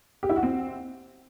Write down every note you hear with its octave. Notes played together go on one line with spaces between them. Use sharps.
G4
E4
F#4
C4